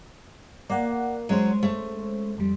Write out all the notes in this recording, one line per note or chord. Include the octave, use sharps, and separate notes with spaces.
A#3 D5 F#5
F#3 G#3 C#4 C5
A3
F2 G3